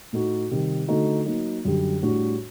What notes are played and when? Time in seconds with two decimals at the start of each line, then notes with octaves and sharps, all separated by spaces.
0.12 A2 A3 D#4 F#4
0.51 C3 D#3 G3
0.88 D3 A3 D#4 F#4
1.26 F#3 A#3 D#4
1.65 F#2 D3 G3
2.02 A2 G3 D4 F#4